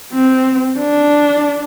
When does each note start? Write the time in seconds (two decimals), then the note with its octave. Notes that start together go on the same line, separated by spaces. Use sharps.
0.13 C4
0.79 D4